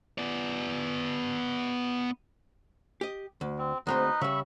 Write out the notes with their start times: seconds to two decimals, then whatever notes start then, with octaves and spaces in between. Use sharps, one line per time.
0.18 B3 D5
3.01 G4 D#5
3.41 D2
3.59 C4
3.87 D2 G#3 C4 D#4 B4 D#5
4.21 C#3 G3 E5 B5 C#6